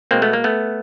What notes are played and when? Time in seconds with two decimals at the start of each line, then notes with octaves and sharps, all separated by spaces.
0.11 B2 G#3 A#3 C4
0.22 A3 B3
0.33 A#3
0.44 A3 B3